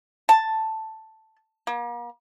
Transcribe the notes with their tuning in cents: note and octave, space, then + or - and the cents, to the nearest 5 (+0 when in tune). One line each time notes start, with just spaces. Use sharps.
A5 +5
A#3 +40